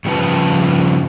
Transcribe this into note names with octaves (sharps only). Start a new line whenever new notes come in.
G2 C#3 F3 F#4 B4 A5